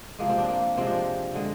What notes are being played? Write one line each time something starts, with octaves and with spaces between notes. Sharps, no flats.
C3 F3 G#3 A#3
C4
D4
A#3
C3 F3 G#3 C4
D4
D3 G#3